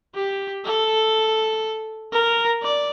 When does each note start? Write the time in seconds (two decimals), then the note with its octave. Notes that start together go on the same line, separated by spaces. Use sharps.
0.15 G4
0.65 A4
2.12 A#4
2.63 D5